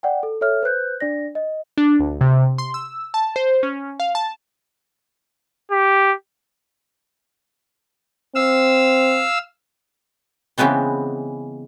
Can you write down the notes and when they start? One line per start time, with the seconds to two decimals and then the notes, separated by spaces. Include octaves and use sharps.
0.03 D5 F#5 G5
0.23 A4
0.41 A4 C#5 E5 F6
0.63 B4 C5 F#6 G6
1.00 D4 D5 A#6
1.35 D#5
1.78 D4
1.99 D2
2.21 C3
2.58 C6
2.74 E6
3.14 A5
3.36 C5
3.63 C#4
4.00 F5
4.15 A5
5.71 G4
8.35 C4 F5 E6
10.58 C#3 E3 G#3 B3 C4